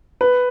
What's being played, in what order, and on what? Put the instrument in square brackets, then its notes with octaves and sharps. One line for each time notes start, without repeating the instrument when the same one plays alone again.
[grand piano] B4